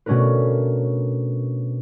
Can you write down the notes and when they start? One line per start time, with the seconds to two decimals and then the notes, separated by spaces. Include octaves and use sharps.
0.06 B2 A3 C#4 D4 A#4 B4